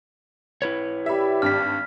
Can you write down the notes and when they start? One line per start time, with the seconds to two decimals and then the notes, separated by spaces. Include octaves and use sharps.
0.62 E4 B4 C#5
1.06 G4 D5 E5 B5
1.42 G#1 G2 F6 B6